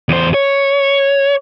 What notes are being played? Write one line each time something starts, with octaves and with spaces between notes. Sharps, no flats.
E2 C5
C#5